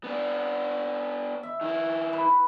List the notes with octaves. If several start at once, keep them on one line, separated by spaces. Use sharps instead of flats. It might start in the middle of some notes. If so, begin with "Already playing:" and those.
B3 D4
E5
D#3 E4
B4